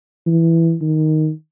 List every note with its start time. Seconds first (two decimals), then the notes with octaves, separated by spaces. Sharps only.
0.27 E3
0.82 D#3